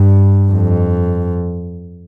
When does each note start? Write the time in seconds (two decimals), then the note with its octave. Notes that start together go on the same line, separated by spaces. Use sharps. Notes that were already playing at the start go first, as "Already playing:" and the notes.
Already playing: G2
0.51 F2